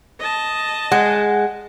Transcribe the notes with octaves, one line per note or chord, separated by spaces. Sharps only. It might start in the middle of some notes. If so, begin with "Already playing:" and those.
D#5 A5
G#3 F#5